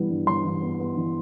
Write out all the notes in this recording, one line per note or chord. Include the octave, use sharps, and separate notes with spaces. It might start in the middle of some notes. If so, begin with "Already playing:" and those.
Already playing: E3 G3 B3
G2
G2 C6
E3
B3
B3
E3